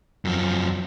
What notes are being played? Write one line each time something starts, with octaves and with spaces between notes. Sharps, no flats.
F#2 F3